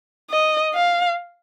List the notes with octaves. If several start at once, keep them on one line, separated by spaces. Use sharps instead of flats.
D#5
F5